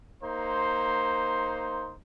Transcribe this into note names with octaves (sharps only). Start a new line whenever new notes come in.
A#3 D#4 C5 C6